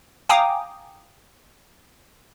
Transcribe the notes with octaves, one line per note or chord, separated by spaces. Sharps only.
F5 G5 G#5 A#5 D6 D#6